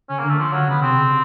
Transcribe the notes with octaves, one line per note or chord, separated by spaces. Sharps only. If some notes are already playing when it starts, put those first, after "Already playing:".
C#3 C#4
A#3
D3
A3
F3
F#3
C#3 B3
C3 C4
C#3